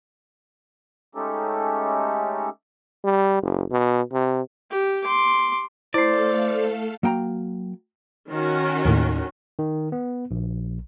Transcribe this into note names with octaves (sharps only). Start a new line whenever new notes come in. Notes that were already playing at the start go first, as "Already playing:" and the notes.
G#3 A3 C#4 D#4 G4 A4
G3
F#1
B2
C3
G4
C6 D6
A3 E4 A4 C5 D5 F5 C7
F#3 A#3 G5 A#5
D#3 C#4 F#4
D#2 A2
D#3
B3
A#1